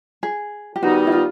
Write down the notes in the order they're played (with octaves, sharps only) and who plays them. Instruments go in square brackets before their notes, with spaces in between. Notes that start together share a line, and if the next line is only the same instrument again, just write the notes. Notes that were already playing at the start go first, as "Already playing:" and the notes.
[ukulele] G#4
G4
[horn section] D#3 G3 B3 D#4 [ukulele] F#4
[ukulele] E4
F4